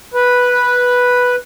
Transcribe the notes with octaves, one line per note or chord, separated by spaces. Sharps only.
B4